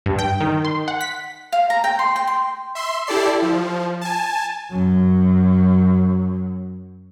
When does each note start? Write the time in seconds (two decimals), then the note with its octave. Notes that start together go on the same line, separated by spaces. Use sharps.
0.06 G2
0.19 G5
0.40 D#3
0.65 C6
0.88 F#5
1.01 B6
1.52 F5
1.70 A#5
1.84 G5
1.99 C6
2.16 G5
2.27 C6
2.75 E5 C6
3.07 E4 G4 A4 D5 C7
3.42 F3
4.01 G#5 A5
4.72 F#2 F#3